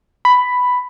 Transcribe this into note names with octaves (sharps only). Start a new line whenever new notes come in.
B5